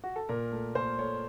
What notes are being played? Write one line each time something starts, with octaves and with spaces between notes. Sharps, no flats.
F#4
A4
A#2 A#4
A3
A#2 C5
A3 C#5